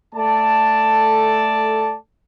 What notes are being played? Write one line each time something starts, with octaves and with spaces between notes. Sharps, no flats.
A3 A4 D5 A5